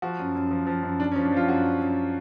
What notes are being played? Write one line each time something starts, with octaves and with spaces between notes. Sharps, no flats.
F3 F#4
F#2
F#2
F3
F3
F#2
F#2 D4
C#4
F3
D4
F3 F4
F#2 F#4
F#2
F#2